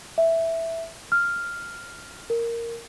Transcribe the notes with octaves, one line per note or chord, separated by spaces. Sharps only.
E5
F6
A#4